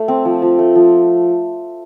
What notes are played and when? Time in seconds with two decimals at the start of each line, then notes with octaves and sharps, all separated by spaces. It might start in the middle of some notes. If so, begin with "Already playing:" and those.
Already playing: A3
0.08 C4
0.25 F3
0.42 F3
0.59 A3
0.75 F3